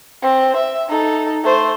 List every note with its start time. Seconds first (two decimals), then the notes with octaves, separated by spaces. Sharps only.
0.23 C4
0.57 E5
0.89 D#4 A4
1.44 A3 C5